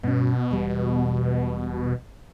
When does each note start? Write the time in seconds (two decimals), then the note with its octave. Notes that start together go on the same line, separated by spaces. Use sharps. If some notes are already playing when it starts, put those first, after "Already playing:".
0.03 G2 B2 C#4
0.51 E1 E2 G3